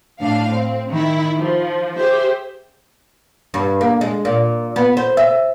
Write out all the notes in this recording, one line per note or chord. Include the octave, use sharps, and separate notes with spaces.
A2 D4 F5
C4
D#3 E4
F3
G4 G#4 C5 E5
G2
A#3
G#3
A#2
B3
C5
E5